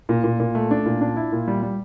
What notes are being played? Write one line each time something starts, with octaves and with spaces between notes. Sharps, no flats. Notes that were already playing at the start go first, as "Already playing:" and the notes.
A#2
A#2
A#2
A3
D4
A#2
D4
E4
A#2
G3
G3